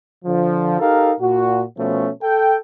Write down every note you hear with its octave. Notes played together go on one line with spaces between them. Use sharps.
D3 F3
D#4 G4 A4 A#4 F5
A#2 F#4
B2 F3 A3 C#4
A4 G5